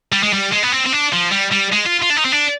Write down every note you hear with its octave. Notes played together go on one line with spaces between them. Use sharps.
G3
G#3
G3
G#3
B3
C4
C4
D4
F3
G3
G3
G#3
F4
F4
D4
D#4
C4
D4